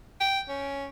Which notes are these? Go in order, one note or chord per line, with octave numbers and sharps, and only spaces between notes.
G5
C#4